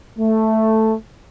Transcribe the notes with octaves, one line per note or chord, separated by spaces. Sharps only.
A3